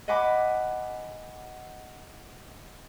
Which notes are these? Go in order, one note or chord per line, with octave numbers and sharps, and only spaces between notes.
D#5 F#5 G#5 B5 D6